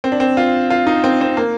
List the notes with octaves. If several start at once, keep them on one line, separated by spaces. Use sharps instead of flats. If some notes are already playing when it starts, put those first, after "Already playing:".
C4
D4
C4
F4
F4
D#4
C4
C4
A#3